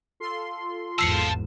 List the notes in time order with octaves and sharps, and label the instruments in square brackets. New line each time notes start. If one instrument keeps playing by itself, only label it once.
[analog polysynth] F4 A4 C6
[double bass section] G#1 E2 G#2 [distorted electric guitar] F5 A5 [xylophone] E6 C7 C#7